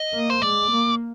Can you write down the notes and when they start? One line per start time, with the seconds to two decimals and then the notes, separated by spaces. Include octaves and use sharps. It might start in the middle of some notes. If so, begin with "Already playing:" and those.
Already playing: D#5
0.13 A#3
0.30 C5
0.42 G#3 D5
0.71 A#3